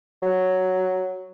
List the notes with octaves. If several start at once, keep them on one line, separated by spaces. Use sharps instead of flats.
F#3